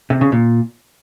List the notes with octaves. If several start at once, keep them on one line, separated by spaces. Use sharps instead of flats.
C3
C#3
A#2